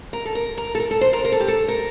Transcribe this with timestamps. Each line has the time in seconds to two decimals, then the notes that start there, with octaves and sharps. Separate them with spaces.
0.13 A#4
0.25 A4
0.35 A#4
0.57 A#4
0.75 A4
0.80 A#4
0.91 A4
1.01 C5
1.13 A#4
1.25 A#4
1.32 A4
1.40 G4
1.48 A4
1.68 A#4